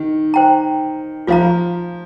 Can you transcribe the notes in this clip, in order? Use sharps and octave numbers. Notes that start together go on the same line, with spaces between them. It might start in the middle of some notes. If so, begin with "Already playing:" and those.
Already playing: D#3
C5 G5 A#5
F3 F4 C5 F5 A#5